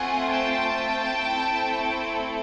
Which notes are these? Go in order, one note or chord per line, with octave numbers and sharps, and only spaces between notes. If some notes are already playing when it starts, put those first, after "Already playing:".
Already playing: A3 C4 F4 F#5 G#5
G5 A5
A3 C4 E4 A4